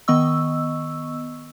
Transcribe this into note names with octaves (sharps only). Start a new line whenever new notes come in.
D#3 B3 D#5 C#6 E6